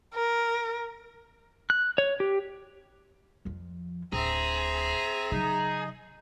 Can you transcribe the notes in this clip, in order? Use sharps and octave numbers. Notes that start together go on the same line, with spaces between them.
A#4
F#6
C#5
G4
F2 F3
D1 C4 G#4 E5 A#5
C#3 F#3 D#4